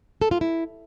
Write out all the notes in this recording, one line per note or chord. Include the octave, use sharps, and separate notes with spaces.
A4
F4
E4